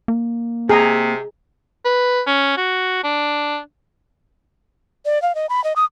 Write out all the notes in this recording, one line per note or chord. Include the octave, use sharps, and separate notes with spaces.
A#3
C3 G#4 A#5
B4
C#4
F#4
D4
D5
F5
D#5
B5
D#5
D#6